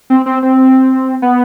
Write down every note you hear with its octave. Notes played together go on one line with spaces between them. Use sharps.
C4
C4
C4
B3